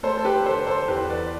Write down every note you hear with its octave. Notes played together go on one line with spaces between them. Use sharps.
A3 A4 C5
A4
G4 B4
D3 A4 C5
A4 C5
E2 G4 B4
B4 D5